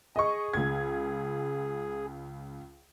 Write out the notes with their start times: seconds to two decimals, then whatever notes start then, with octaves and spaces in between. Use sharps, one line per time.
0.16 G#4 D#5 C#6
0.53 C#2 G#6